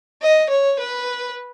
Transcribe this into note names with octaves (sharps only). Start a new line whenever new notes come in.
D#5
C#5
B4